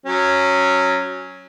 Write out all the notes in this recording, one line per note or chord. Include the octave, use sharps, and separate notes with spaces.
F#3 C#4